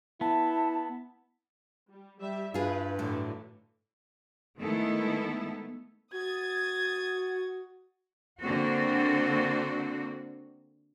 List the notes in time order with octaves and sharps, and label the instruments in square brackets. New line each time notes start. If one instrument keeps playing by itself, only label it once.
[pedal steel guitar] B3 [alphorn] E4 [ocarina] A5
[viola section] G3
[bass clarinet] G3 [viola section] G4 E5
[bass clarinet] G2 [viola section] E4 B4 [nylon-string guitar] F4 G#4
[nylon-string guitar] A2 [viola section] D3 E3 F#3
[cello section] D#3 G#3 A3 B3 E4 A4
[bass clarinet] F#4 [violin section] D#6 G#6 A6
[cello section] D3 A#3 C4 F#4